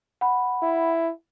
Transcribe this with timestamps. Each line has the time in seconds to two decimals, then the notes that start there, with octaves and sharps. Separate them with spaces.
0.21 F#5 B5
0.63 E4